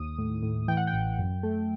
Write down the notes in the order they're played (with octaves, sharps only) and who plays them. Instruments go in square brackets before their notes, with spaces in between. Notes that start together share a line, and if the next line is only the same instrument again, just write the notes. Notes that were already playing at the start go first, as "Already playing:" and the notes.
Already playing: [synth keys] D#2 D#6
A2
A2
E3 G5
F#5
G5
A1
F#2
A3